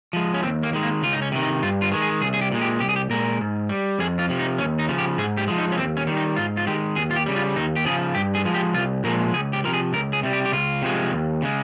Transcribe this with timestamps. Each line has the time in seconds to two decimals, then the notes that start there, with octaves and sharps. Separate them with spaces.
0.13 F3 G#3
0.34 C#4
0.43 D#2 C4
0.63 A#3
0.73 D#3 G#3
0.83 A#3
1.02 C#2 F4
1.13 D#4
1.22 C#4
1.32 C3 D#3
1.43 D#4
1.62 G2 F4
1.82 F4
1.92 D#3 G#3
2.02 G#4
2.21 C2 G#4
2.34 G#4
2.41 G4
2.52 A#2 G#3
2.61 G4
2.80 C2 G4
2.89 G#4
2.96 G4
3.10 A#2 G#3 A#4
3.41 G#2
3.69 G3
3.99 F2 G#4
4.19 F4
4.29 C3 F3
4.39 D#4
4.58 D#2 C#4
4.79 D#4
4.89 C#3 F3
4.98 G4
5.18 G#2 G#4
5.37 G4
5.48 F3 G#3
5.58 D#4
5.72 C#4
5.78 D#2 C4
5.97 C#4
6.07 D#3 G3
6.17 D#4
6.36 G#2 F4
6.57 F4
6.67 D#3 G#3 G4
6.96 D#2 G#4
7.11 F4
7.16 G4
7.26 C#3 G3
7.36 F4
7.55 D#2 D#4
7.76 G4
7.85 C#3 F3 G#4
8.15 G2 G4
8.35 G#4
8.45 F3 G#3
8.54 G4
8.74 C2 F4
9.04 A#2 F3 G#3 A#4
9.33 C#2 G#4
9.53 G4
9.64 C3 F3 A#4
9.74 G#4
9.93 C#2 A#4
10.13 G#4
10.23 C3 G3
10.33 G4
10.45 G4
10.53 C#2 F4
10.82 C3 F3 G#3
11.12 D#2
11.42 C#3 G#3